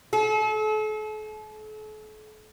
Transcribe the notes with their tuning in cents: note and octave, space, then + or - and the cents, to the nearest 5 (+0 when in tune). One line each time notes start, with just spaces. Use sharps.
A4 -40